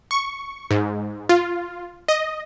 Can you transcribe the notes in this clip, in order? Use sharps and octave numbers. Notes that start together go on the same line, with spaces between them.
C#6
G#2
F4
D#5